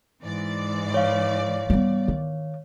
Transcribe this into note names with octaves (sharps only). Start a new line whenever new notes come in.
G#2 E3 D5
C#5 F5
G3 B3
D#3